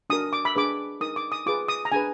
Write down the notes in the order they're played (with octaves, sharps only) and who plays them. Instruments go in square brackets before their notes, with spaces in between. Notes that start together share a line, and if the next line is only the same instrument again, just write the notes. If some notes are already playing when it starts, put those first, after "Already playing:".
[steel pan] D4 F#4 A#4 D#6
D6
B5
D4 G#4 B4 D6
D#4 A#4 D#6
D6
D#6
F4 G#4 B4 D6
D#6
A#5
D4 G#4 B4 G#5